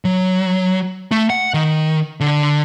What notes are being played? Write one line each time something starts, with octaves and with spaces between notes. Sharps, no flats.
F#3
A3
F#5
D#3
D3